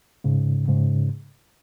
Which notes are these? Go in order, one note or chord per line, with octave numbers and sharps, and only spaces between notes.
G#2 C#3
G#2 C#3